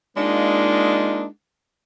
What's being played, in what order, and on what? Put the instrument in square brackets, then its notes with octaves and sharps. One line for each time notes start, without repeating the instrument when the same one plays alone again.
[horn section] G#3 A#3 D4 D#4 F4